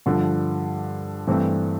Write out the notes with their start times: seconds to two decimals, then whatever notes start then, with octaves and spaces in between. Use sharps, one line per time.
0.06 G2 D3 F3
1.27 G2 E3 A3 C4